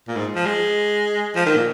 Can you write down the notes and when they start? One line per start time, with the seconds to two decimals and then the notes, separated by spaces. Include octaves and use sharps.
0.08 A#2
0.16 G#2
0.36 F3
0.46 G#3
1.36 F3
1.46 D#3
1.56 A#2